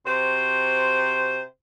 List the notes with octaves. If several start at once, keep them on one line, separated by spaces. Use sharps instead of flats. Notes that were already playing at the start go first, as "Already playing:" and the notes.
C3 F#4 C5